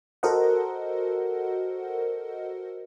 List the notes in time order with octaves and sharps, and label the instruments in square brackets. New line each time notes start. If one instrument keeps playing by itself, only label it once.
[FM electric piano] F#4 A4 A#4 C5 D#5 F#5